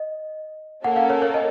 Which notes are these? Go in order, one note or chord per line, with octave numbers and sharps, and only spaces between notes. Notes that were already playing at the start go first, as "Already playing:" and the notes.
Already playing: D#5
A#3 C#4 A4 F#5
F5
C#5
C#5
D#5